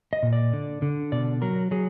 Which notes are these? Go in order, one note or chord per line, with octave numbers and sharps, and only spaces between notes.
D#5
A#2
D5
D3
D3
B2 D5
F#3 A#4
F#3 G#4